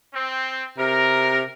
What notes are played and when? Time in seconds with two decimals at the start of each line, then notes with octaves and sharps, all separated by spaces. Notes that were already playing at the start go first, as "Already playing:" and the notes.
0.14 C4
0.78 C3 A#4